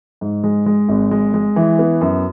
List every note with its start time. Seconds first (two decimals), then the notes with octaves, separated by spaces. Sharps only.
0.21 G#2
0.43 G#3
0.66 G#3
0.89 G#1
1.11 G#3
1.34 G#3
1.56 E3
1.79 B3
2.01 F#2